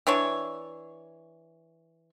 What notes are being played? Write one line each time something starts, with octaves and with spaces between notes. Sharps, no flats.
E3 D4 C#5